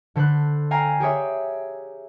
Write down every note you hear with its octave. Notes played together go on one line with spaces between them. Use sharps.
D3 A4 C5 B5 F#6
F5 G5 G#5 A#5 C7
G4 G#4 C#5 E5